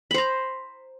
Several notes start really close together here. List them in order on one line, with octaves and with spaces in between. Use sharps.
B5 C5 A#5